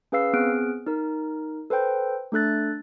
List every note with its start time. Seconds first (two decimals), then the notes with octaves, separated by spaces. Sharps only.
0.12 C#4 G#4 B4 F5 E6 C7
0.33 B3 C4 G#4 F6 F#6 D7
0.87 D#4 A#4
1.70 A4 B4 C5 G5 G6
2.32 A3 D4 A4 F#6 A6